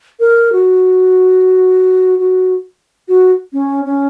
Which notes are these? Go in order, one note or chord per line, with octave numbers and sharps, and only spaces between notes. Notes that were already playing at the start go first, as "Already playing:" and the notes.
A#4
F#4
F#4
F#4
C#4
C#4